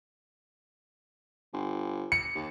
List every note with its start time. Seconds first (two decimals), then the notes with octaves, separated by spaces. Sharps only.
1.53 G1
2.12 C#7
2.35 D#2